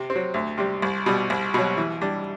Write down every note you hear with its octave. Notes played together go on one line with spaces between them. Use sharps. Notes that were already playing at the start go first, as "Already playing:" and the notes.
Already playing: C3
C4
F#3
D2
C3 G3
C2
B2 G3
C2
B2 F#3
E3
G3 D4